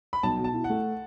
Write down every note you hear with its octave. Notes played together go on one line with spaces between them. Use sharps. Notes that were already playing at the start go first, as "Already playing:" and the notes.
B5
B1 A5
B2
A5
E4
F#5
A3